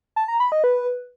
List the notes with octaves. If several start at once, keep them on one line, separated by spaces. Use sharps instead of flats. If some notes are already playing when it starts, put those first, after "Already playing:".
A5
A#5
B5
D#5
B4